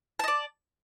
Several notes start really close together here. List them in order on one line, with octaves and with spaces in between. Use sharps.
A5 D#5 D5